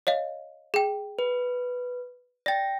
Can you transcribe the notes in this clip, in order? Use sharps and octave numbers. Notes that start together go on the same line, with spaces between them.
C#5 D#5 F5
G#4 G5
B4
D5 G5 A6 A#6